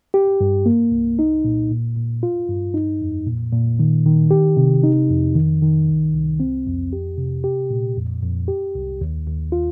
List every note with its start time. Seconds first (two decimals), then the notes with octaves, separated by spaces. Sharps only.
0.14 G4
0.41 G2
0.66 A#3
0.92 C2
1.19 D#4
1.45 A#2
1.71 A#2
1.96 A#2
2.23 F4
2.49 G2
2.74 D#4
3.01 F2
3.26 A#2
3.53 A#2
3.79 D#3
4.06 D#3
4.31 G4
4.57 C3
4.83 D#4
5.10 F2
5.35 D#3
5.62 D#3
5.88 C2
6.13 C2
6.40 C4
6.67 F2
6.93 G4
7.18 C3
7.44 G4
7.70 A#2
7.97 F2
8.22 F2
8.48 G4
8.75 C2
9.01 D#2
9.27 D#2
9.52 F4